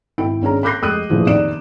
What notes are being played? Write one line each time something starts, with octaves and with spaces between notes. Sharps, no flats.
G#1 E4 G5 D7
G#1 C#4 D4 G#4 A#5
B5 D6 F#6 G6 A#6 C7
F1 G#3 D#6 F#6 D#7
D#1 A#1 A2 E3 F3 G#4
F2 C3 D#3 D5 D7 E7